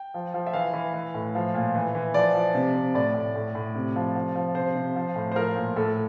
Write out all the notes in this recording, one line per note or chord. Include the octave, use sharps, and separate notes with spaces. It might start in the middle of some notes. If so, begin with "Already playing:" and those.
Already playing: G5
F3
F3
E5
E3 F5
E3
E3
A2
F3
A#2
E3
E3
F3 D5
F3
C3
C3
A2 D5
A2
A2
A2
C3
F3
F3
F3
C3 C5
C3
F3
A2
C5
F3 A#4
A#2
A2 A4